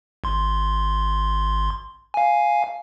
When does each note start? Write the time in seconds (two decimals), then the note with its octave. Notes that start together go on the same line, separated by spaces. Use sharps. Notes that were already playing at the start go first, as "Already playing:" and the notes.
0.24 G#1 C6
2.14 F5 G#5